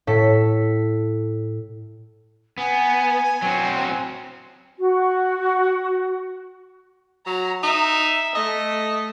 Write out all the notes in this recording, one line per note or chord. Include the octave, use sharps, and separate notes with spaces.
A2 A4 B6
B3 G#5
F#3 C4
F#4
F#3 A#5
D#4 E5
A3 D#5